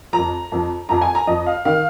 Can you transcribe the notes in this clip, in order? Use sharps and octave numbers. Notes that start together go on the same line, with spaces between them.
F3 A#5
F2
F2 F3
F2 F3 A#5
G#5
A#5
F2 F3 D#5
F5
D#3 F5